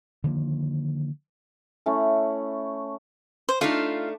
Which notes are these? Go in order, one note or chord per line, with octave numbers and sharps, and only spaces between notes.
D3 D#3 F3 A#3
A3 C#4 E4
C5
A3 D4 D#4 F4 F5